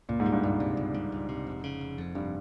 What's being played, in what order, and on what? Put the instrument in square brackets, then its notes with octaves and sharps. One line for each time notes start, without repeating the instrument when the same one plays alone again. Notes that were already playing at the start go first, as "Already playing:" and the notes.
[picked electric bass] C#2 [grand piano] A#2
[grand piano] G#2
[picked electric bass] G3
[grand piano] G2
[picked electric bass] C#2 [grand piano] G#2
[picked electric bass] C3
C#2
G3
C#2
C3
F1
C#3
F1
F2
[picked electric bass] F1 [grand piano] G2